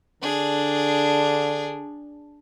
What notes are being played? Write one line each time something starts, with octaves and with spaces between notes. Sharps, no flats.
D3 D4 G#4